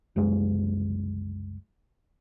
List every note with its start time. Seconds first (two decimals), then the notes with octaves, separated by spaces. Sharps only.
0.16 F#1 C2 F#2 G#3